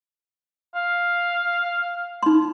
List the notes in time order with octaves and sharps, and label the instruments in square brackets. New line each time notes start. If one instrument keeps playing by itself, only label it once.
[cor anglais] F5
[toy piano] D#4 C6